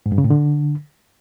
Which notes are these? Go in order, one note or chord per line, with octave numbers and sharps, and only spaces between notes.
G#2
G2
C#3
A2
D3